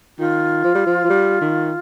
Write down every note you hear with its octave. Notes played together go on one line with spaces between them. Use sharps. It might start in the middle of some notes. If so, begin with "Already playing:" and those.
D#3 F4
F3
G3
F3
F3
G3
D#3